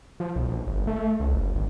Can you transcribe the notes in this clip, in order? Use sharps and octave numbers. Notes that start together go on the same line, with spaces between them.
F3
B1
A#1
G1
A3
C#2
F#1
G#1